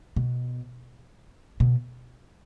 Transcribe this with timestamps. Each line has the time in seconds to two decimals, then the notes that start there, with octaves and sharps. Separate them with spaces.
0.16 B2
1.60 B2